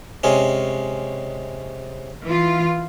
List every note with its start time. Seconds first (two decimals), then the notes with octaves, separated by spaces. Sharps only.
0.24 C3 G#3 C#4
2.24 E3 F4